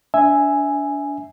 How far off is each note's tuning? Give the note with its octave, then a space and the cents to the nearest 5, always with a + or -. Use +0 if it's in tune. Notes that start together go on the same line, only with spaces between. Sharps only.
D4 -30 E5 +0 G#5 +0